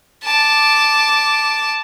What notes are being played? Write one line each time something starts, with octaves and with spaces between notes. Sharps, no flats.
A5 D6